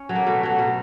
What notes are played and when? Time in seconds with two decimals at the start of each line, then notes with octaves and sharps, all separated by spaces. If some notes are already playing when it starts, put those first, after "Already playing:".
Already playing: C#4
0.09 F#3 A3
0.15 A#3
0.26 B2 A3
0.43 F#3 A3
0.59 B2